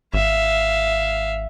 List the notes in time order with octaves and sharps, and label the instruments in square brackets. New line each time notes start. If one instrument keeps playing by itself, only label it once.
[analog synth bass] G#1 [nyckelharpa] E5 F5